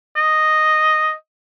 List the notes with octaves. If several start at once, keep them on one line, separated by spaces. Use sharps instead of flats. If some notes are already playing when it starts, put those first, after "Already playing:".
D#5